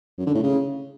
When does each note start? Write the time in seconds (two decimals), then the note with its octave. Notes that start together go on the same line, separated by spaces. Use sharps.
0.18 F#2
0.26 D3
0.35 A2
0.43 C#3